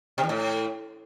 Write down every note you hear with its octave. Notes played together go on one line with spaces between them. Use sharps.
C3
E2
A2